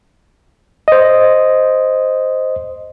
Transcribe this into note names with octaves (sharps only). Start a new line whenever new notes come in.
C5 D#5